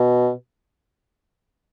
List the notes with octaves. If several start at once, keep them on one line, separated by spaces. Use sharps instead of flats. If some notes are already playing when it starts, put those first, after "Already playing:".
Already playing: B2